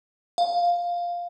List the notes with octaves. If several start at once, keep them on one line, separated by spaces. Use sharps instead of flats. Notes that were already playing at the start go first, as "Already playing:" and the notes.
F5